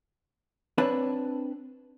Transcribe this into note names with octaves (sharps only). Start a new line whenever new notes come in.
C4 D4 B4 C#5 A5 B5